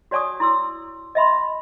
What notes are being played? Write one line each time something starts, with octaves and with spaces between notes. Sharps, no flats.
F#4 C#5 D5 G#5 C#6 D#6
E4 C6 E6
D#5 E5 B5 C6